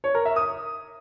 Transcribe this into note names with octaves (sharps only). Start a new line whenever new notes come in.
C#5
A#4
E5
D#6